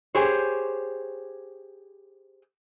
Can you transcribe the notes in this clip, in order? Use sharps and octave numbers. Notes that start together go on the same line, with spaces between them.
G4 G#4 C5 C#5